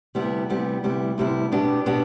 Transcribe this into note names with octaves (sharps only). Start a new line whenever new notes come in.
D2 C3 G3 B3 E4
D2 C3 G3 B3 E4
D2 C3 G3 B3 E4
D2 C3 G3 B3 E4
B2 B3 D4 G4
B2 B3 D4 G4